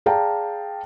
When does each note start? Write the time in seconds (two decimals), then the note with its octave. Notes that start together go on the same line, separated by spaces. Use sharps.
0.06 G#4 D5 F5 G5 A5 A#5